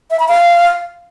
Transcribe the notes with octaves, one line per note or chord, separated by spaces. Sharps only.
E5
B5
F5